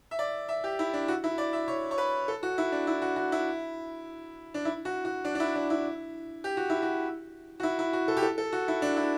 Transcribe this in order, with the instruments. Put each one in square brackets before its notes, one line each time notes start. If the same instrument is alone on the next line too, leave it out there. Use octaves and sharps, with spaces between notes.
[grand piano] E5
D5
E5
G4
E4
D4
F#4
E4
D5
E5
C#5
C#5
B4
A4
F#4
E4
D4
E4
F#4
F#4
E4
D4
E4
F#4
F#4
D4
D4
E4
D4
E4
G4
F#4
E4
F#4
F#4
E4
E4
F#4
A4
G4
A4
A4
F#4
E4
D4
E4